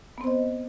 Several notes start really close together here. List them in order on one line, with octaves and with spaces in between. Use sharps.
B3 C4 C5 D#5